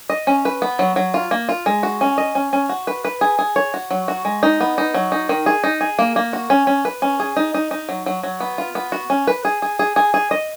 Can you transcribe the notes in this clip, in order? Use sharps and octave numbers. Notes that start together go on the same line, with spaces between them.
D#5
C#4
B4
B3
F#3
F#3
F4
A#3
F4
G#3
F#4
C#4
D#5
C#4
C#4
F#4
B4
B4
G#4
G#4
C#5
F#4
F#3
F#4
G#3
D#4
B3
D#4
F#3
D#4
D#3
G#4
D#4
G#4
A#3
A#3
F#4
C#4
C#4
B4
C#4
G#4
D#4
D#4
D#4
F#3
F#3
F#3
B3
F4
B3
F#4
C#4
B4
G#4
G#4
G#4
G#4
G#4
D#5